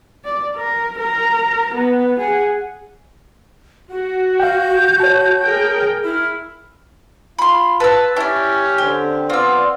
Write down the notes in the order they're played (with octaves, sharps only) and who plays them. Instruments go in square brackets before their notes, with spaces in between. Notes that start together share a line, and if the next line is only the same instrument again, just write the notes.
[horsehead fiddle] D5
A#4
A#4 A#5
B3
G#4 F#5
[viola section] F#4 [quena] F#5
[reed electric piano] F5 G5 [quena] G6
[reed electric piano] C#5 A5
[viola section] G#4 A#4 G5
[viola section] E4 [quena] F6
[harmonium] F4 [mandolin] B5 C6
[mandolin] B4 E6 [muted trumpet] A5
[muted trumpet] C#4 [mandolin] E4 D5 [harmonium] G4 G5
[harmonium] D3 C4 [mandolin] G4
[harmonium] B3 D5 [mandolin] C4 E6 [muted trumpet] F4